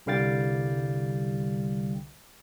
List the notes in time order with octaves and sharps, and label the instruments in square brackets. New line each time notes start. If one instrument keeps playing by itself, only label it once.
[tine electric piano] C2 D3 G3 F5 G5 A6